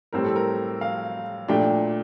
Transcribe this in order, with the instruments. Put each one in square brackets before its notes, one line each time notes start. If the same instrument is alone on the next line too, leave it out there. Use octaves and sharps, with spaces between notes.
[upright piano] A2 G3 C4 A#4
A4
A#4
F5
A#2 F3 A3 D4 G5